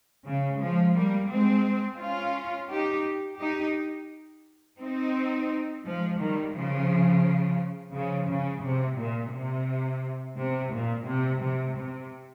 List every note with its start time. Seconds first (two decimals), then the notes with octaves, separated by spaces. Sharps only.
0.26 C#3
0.61 F3 G#3
0.96 G3 A#3
1.31 G#3 C4
2.01 C#4 F4
2.71 D#4 G4
3.40 D#4 G4
4.80 C4 D#4
5.85 F3 G#3
6.19 D#3 G3
6.55 C#3 F3
7.94 C#3 F3
8.29 C#3
8.64 C3
8.98 A#2
9.33 C3
10.38 C3
10.73 A#2
11.08 C3
11.43 C3
11.78 C3